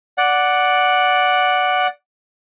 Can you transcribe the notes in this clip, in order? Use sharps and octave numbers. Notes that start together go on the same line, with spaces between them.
D5 F#5